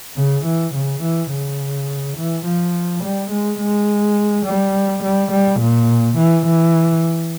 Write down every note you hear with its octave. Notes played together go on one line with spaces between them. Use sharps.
C#3
E3
C#3
E3
C#3
E3
F3
G3
G#3
G#3
G3
G3
G3
A#2
E3
E3